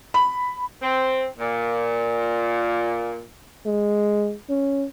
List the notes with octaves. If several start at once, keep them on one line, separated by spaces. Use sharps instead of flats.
B5
C4
A#2
G#3
C#4